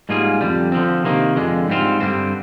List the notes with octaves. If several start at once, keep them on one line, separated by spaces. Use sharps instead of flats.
G#2 G3 A#3 F4 G#4
F2 D3 G3
D3 F3 C4
C3 D#3 A#3
F2 D3 G#3
G#2 G3 C4 F4
G2 D3 G3 C4